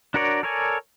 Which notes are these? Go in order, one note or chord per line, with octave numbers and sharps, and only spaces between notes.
D4 F#4 A#4 C#5 D5
A4 A#4 C#5 D5 G#5